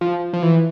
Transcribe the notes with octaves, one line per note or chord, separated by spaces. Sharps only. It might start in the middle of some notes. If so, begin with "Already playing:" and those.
F3
F3
E3